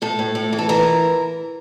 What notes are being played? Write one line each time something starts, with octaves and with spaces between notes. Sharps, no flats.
A2 A4
A2
A2
E3
A4
E3 A#4